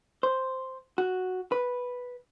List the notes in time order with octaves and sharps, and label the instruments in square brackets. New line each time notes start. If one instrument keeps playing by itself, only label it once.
[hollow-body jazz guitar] C5
F#4
B4